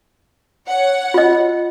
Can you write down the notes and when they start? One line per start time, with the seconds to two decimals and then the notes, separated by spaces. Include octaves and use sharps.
0.68 C#5 F#5
1.14 F4 D#5